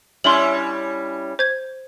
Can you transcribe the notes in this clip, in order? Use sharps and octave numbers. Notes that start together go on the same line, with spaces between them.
G3 C#4 E4 C6 F#7
C5 G#6